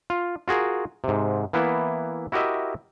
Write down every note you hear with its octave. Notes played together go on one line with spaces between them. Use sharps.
F4
F4 F#4 G#4 A#4
G#2 C3
E3 A#3 B3 E4
E4 F#4 G4 A#4 D#5 E5